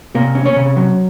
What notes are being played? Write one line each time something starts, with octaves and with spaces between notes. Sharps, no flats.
C3 A#3 A#4
C#4
C#4 C#5
C3
F#3